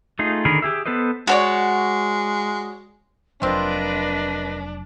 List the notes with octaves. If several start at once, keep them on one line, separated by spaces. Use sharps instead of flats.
A3 D#4 F4 G#4
D3 D#3 G#4 A#4 B5
G4 G#4 E5
B3 A4 B4 C5 D#5
G#3 F#4 C#5 D5
F1 F#3 C4 D4 F4 A#4 B4 D#5